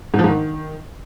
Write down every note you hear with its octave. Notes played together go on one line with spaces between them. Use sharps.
G#2
F3
G#2
D#3